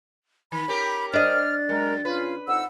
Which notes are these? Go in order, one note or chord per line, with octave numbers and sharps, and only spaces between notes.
D#3 B5
C#4 G4 A#4
D4 C5 D#5 F6 A6
F#2 G#3 A#4
C#3 C#4 F4 B4
F2 D#4 F#5 E6